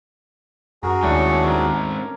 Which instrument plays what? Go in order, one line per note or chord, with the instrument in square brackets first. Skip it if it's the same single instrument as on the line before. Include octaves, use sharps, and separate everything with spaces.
[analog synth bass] F#2 [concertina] F#4 G#4 [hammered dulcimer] A#4
[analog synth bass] D#2 [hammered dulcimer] A2 C#4 D4 [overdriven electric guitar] G#3 C#5
[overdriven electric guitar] G#2 C4 [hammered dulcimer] A#4 C#5